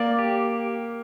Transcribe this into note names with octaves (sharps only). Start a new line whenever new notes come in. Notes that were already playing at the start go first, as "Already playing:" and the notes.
Already playing: A#3 D5
G4